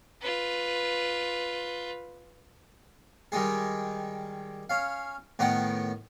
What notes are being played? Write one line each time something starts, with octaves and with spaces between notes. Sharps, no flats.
F4 B4
D#3 G3 G#3 G#4
C#4 F5
A2 D#3 B3 F#5 G5